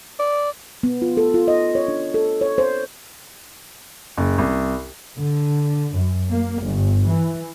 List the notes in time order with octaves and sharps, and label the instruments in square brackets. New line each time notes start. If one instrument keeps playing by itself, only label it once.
[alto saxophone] D5
[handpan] B3
F4
A4
F4
D#5
C#5
D4
A4
C#5
C5
[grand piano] F#1
C2
[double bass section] D3
F#2
A#3
G1
E3